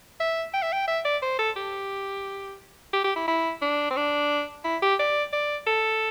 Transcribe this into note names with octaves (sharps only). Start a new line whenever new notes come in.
E5
G5
E5
G5
E5
D5
C5
A4
G4
G4
G4
E4
E4
D4
C4
D4
E4
G4
D5
D5
A4